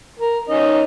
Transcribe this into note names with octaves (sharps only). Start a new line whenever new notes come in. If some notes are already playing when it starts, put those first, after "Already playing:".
A#4
D#3 C#4 D#5